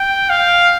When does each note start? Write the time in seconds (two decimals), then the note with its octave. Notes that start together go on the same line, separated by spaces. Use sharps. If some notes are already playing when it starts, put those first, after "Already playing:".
Already playing: G5
0.29 F5